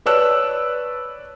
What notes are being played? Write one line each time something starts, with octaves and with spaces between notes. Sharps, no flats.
B4 C#5 D5 A5 E6 F#6